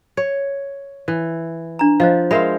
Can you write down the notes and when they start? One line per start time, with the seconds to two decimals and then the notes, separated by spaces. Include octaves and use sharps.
0.17 C#5
1.08 E3
1.79 D4 A#5
2.00 F3 C5 D#5 F5
2.31 G#3 A#4 C5 E5 F5 B5